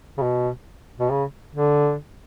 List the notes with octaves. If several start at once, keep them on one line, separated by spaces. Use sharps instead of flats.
C#3
B2
B2
C#3
D3